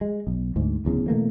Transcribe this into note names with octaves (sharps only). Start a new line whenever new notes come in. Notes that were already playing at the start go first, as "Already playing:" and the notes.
G#3
B1
D2 G#2
D1 E2 C#3
B2 E3 A3 A#3